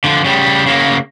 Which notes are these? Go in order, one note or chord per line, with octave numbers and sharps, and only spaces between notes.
D3 F3
C#3 G3
C#3 A#3